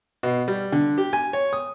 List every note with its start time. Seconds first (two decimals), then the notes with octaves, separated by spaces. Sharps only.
0.23 B2
0.48 G3
0.72 D3
0.98 G4
1.13 G#5
1.33 C#5
1.53 D#6